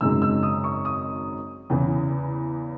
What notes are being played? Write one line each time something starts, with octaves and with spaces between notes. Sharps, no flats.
G#1 F#2 C#3 G#3 D#4 E6
E6
D#6
C#6
D#6
E2 C#3 E3